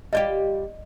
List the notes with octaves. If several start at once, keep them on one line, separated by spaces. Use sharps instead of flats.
G3 F4 G4 D5 D#5